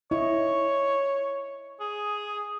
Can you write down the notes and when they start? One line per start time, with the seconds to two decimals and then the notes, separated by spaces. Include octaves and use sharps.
0.11 E4 C#5 D#5
1.80 G#4